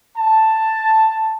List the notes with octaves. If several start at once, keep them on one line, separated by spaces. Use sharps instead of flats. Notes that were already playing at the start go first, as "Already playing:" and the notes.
A5